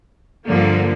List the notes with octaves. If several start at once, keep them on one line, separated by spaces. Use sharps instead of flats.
G2 D3 F3 A#3